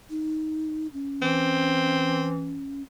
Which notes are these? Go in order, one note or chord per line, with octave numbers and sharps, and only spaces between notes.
D#4
C#4
E3 C4